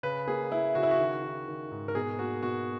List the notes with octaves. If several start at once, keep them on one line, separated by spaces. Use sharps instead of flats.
C#3 B4
A#3 G#4
A#3 E4
C#3 F#4
E4
F#4
D#3
D#3
D#3
G#2
A#4
B2 G#4
A#3 F#4
B2 F#4